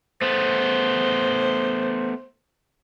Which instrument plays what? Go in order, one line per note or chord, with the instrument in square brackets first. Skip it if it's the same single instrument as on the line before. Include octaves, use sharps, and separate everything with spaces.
[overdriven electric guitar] A3 B3 [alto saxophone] C5